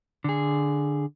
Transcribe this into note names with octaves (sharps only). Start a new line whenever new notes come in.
D3 G#4